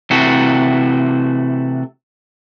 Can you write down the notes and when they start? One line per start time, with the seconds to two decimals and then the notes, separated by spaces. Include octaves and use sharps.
0.11 C3 E3 A3 E4 F#4